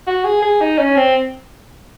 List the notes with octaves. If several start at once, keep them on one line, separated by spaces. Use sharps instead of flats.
F#4
G#4
G#4
D#4
C#4
C4